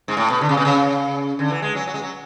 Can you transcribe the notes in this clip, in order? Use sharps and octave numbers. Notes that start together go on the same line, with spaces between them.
G#2
A2
B2
D3
C#3
B2
C#3
D3
E3
G#3
F#3
F#3
G#3
F#3